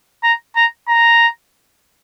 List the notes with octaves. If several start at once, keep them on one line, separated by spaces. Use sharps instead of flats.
A#5
A#5
A#5